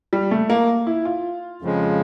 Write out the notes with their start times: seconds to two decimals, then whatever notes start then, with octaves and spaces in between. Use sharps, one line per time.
0.13 G3
0.31 A3
0.50 A#3
0.87 E4
1.05 F4
1.62 F2 C#3 F3 G#3